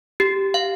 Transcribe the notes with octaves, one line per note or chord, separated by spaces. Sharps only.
G4
F5